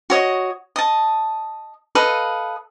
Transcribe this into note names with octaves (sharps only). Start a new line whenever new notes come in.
F#4 C#5 D#5
D#5 A5
A4 B4 D#5 F5